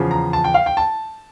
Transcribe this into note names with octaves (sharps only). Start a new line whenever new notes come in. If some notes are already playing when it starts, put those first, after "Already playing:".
Already playing: E2 C#3 F3
A#5
A5
G5
F5
G5
A5